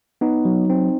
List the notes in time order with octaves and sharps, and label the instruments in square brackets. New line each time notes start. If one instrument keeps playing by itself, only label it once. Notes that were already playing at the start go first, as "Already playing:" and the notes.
[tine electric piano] B3 D#4
F#3
C4